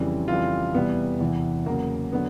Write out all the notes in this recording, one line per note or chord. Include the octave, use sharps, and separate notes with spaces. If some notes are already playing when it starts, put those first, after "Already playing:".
Already playing: F2 C#3 E3 G3
F2 C#3 E3 G3 F4
E2 C3 E3 G3 B3
E2 C3 E3
E2 C#3 F#3 A#3
D3 F#3 B3